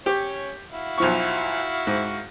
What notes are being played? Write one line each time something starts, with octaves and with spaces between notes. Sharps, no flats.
C#4 G4 C#5
E4 F#4 F5
B1 F3 C#6
G#2